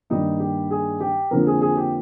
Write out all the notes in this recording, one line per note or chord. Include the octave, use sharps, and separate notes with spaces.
G2 D#3 G3 A#3 D#4
G4
G#4
G4
F2 D3 F3 A#3 A#4
G#4
G#4
G4